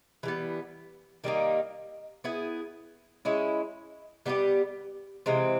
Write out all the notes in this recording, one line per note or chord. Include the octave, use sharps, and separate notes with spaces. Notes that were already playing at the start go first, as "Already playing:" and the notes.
E3 G3 B3
D#3 G3 A#3 D#4
B3 E4 G#4
G#3 C#4 E4
G3 B3 D#4 G4
C3 E3 G#3 C4